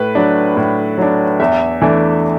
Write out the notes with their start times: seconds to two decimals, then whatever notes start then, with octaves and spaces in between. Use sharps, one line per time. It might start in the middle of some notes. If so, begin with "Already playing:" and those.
Already playing: A2 B4
0.15 F#3 D4
0.57 A2
0.98 F#3 D4
1.40 E2 E5
1.82 E3 A3 D4